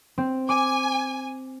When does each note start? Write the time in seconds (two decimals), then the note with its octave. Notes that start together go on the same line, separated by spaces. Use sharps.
0.18 C4
0.49 G#5 D6